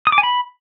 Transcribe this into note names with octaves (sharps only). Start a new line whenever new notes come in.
D#6
D6
G#5
B5